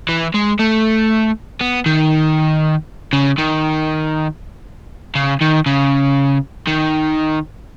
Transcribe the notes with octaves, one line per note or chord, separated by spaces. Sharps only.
E3
G#3
A3
B3
D#3
C#3
D#3
C#3
D#3
C#3
D#3